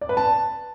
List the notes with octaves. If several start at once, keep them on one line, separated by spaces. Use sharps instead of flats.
D5
B4
A5